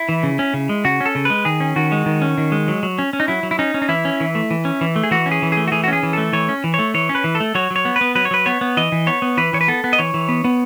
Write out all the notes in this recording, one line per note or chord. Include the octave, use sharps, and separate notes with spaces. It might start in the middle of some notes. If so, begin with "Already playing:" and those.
Already playing: E4
E3
C#3
C#4
C#3
G#3
C#3 F#4
C#4
A4
C#3
G#3 B4
D#3 G#4
C#4
D#3 F#4
G#3
D#3
C#4
D#3
G#3
F#3
F#3
C#4
C#4
D#4
F#3 E4
F#3
E4
C#4 D#4
C#4
D#4
E3 E4
C#4
E3
A3
E3
C#4
E3
A3
G#4
E3 F#4
C#4
G#4
E3
A3 G#4
F#4
E3 G#4
F#4
C#4 G#4
E3
A3 A4
E3 C#5
C#4
E3
A3 C#5
E3 C#5
C#4
B4
E3
A4
A3
F#3 C#5
F#3
C#5
B3
B4
B3
F#3 B4
C#5
F#3 B4
B3 C#5
B3
E3 D#5
E3
B3 C#5
B3
E3 B4
E3 C#5
B4
B3 A4
B3
D#5
E3 C#5
E3
B3
B3